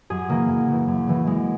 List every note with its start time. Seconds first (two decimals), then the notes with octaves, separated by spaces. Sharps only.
0.10 F#2 G#4
0.29 C#3 E3 A#3
0.49 F#2
0.68 C#3 E3
0.88 F#2
1.07 C#3 E3
1.26 F#2 G#3